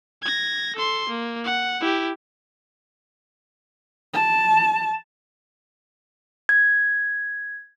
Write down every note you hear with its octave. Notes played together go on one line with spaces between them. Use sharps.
G#6 A#6
A4 C6
A#3
F#5
E4 G4
A5
G#6